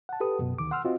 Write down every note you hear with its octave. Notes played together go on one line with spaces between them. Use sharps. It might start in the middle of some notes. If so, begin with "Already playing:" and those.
F#5 A5
G4 A4 B4 D#6
F#2 B2
D2 D#3 D6
F#5 C6 E6 F6
C4 F4 F#4 D#5